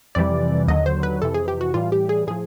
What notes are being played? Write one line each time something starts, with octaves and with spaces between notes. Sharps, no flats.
F2 C3 E3 G3 D5
D#2 D3 F#3 D#5
C5
B4
F2 C3 E3 A4
G#4
G4
F#4
A2 E3 G3 F4
G4
G#4
A2 F3 G#4